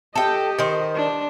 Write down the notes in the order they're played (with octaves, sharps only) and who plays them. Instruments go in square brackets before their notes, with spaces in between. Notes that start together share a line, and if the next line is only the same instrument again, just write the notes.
[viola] G4 D#5 [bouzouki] A4 G5
[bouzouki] D#3 C5
[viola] D4